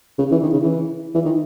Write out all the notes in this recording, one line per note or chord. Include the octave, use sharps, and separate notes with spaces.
C#3
E3
D#3
C#3
E3
E3
D#3